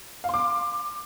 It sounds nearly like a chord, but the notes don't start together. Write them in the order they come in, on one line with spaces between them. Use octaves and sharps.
F5 C6 D6